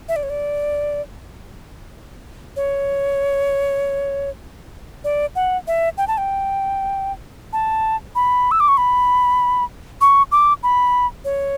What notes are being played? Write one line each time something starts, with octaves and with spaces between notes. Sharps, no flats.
E5
D5
C#5
D5
C#5
D5
F#5
E5
G5
A5
G5
A5
B5
E6
D6
C#6
B5
C#6
D6
B5
C#5